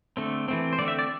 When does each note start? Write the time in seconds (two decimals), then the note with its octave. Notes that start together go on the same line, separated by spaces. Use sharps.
0.17 D3 A3 C4
0.48 E3 A3 C4
0.73 C5
0.79 D3 A3 C4 D5
0.88 E5
0.99 D5